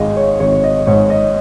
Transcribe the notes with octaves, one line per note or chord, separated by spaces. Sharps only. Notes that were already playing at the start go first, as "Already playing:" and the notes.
Already playing: G#1 G#3 D#5 F5
C#5
G#1 C#5
D#5
G#2 C#5
D#5